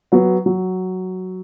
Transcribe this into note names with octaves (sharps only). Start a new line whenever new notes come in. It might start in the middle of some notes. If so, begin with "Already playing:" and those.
F#3 B3
F#3